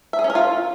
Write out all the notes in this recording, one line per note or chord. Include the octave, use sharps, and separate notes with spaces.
E5
G#4
C#4
A#4
F4